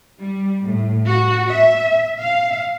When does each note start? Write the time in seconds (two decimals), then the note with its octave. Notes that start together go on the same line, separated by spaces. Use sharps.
0.20 G3
0.63 A2
1.07 F#4
1.49 E5
2.21 F5